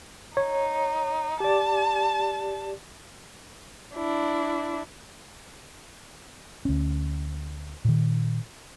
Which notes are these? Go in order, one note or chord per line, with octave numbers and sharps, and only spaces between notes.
D#4 C#5
G4 D5 A5
D4 E4
D2 C#4
A#2 D#3